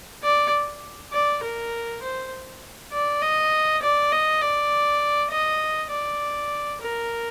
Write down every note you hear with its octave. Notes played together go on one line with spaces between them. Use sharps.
D5
D5
A#4
C5
D5
D#5
D5
D#5
D5
D#5
D5
A#4